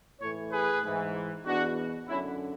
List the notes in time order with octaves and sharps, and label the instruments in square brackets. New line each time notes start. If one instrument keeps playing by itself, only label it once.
[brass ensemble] A2 E3 A4 C#5
G#4 B4
G#2 E3
E2 B2 D4 F#4
F#2 D3 C#4 E4